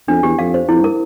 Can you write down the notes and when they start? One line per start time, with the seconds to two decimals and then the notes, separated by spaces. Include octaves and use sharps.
0.08 F2 D4
0.23 E2 G4
0.39 F2 F5
0.54 C5
0.69 F2 E4
0.79 G2
0.84 A#4